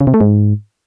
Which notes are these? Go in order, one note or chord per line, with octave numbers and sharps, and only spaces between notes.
C#3
C3
A3
G#2